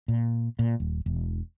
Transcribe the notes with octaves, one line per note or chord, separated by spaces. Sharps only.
A#2
A#2
D#1
E1